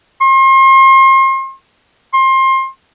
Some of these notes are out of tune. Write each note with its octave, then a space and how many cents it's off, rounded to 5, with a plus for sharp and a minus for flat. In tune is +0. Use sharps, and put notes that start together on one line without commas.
C6 +40
C6 +25